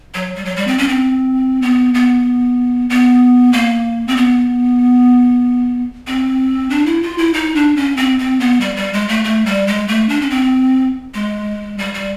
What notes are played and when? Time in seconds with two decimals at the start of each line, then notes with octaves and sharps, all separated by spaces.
0.15 F#3
0.35 G3
0.45 F#3
0.56 G3
0.67 C4
0.78 C#4
0.89 C4
1.62 B3
1.94 B3
2.90 B3
3.53 A#3
4.08 C4
4.17 B3
6.07 C4
6.70 D4
6.86 E4
7.02 F4
7.18 E4
7.34 D#4
7.55 D4
7.76 C#4
7.97 C4
8.19 C4
8.40 B3
8.61 G3
8.76 G3
8.93 G#3
9.09 A3
9.24 A3
9.46 G3
9.67 G#3
9.88 A3
10.09 D4
10.21 C#4
10.30 C4
11.14 G#3
11.78 G3
11.94 G3